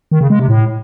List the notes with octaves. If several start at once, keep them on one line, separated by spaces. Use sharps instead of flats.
D#3
C#3
G#3
C3
A2